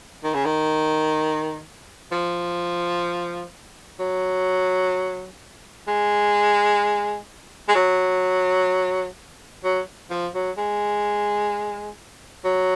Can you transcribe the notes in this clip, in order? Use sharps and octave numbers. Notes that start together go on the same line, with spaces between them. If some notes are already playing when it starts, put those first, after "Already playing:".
D#3
C#3
D#3
F3
F#3
G#3
G#3
F#3
F#3
F3
F#3
G#3
F#3